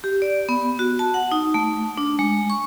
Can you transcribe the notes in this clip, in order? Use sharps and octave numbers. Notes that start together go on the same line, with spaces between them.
G4
D5
B3
F#4
A5
F#5
D#4
A3
D4
G#3
C#6